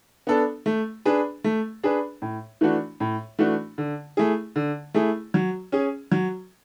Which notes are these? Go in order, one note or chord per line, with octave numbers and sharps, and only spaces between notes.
B3 D4 A4
A3
D4 G#4 B4
A3
D4 G#4 B4
A2
E3 A3 D4 F#4
A2
E3 A3 D4 F#4
D3
A3 E4 G#4
D3
A3 E4 G#4
F#3
C#4 G#4
F#3